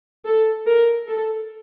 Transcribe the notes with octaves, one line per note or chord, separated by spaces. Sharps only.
A4
A#4
A4